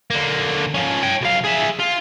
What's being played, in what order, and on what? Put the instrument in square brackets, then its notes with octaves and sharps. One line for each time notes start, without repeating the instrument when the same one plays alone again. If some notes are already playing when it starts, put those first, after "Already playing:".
[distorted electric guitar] D3 A#3
F3 C#4
C#5 G5
B1 F5
G#4 E5
F4